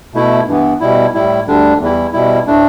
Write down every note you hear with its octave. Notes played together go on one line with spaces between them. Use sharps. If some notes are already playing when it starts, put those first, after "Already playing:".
B2 A3 E4
G2 E3 B3
B2 G3 E4
A2 G3 E4
D2 D3 G3 D4
E2 E3 G3 E4
B2 G3 E4
A2 A3 D4